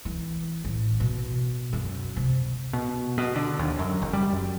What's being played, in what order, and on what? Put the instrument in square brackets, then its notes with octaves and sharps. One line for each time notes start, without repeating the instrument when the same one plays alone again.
[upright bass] E3
A1
B2
F#2
C3
[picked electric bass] B2
B2
D3
D#2
F#2
F#1
G3
F#2